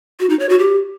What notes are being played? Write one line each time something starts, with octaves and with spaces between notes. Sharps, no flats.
F#4
D#4
C#5
F#4
G4